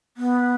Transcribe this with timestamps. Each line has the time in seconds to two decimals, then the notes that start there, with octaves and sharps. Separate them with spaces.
0.17 B3